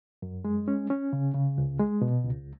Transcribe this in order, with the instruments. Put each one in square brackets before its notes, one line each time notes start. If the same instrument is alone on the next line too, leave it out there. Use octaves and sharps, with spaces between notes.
[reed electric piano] F#2
G#3
C#4
C#4
C#3
C#3
C#2
G#3
B2
C#2